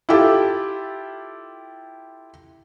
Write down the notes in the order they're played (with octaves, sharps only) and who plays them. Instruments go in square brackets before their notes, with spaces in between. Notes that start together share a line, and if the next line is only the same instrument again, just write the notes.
[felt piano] E4 F4 G4 A4